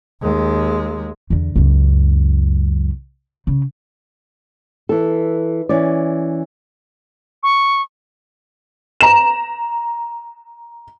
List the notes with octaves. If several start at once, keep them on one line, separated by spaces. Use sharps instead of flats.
D#2 G#3
E2 D3
C#2 F#2
C#3
E3 A4
E3 C#4 D5
C#6
A#5 E7